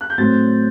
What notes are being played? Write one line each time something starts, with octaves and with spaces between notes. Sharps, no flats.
F#6
G6
A2 F#3 C4 A6